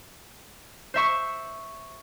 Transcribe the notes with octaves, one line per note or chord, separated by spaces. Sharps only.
C5 E5 C#6